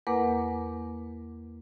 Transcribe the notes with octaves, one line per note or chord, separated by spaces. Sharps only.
E2 A#3 A#4 B4 F#5 D6